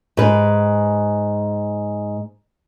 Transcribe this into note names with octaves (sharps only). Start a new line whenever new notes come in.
G#2 B4